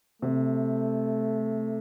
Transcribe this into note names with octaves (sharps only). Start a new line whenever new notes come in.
C3 A3